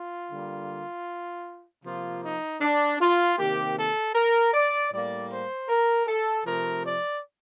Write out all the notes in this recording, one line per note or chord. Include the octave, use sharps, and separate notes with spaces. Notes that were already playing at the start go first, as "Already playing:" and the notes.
Already playing: F4
D3 G3 A#3
C3 F3 A#3 F4
D#4
D4
F4
C3 D#3 A#3 G4
A4
A#4
D5
A2 G3 A#3 D5
C5
A#4
A4
C3 F3 A3 A#4
D5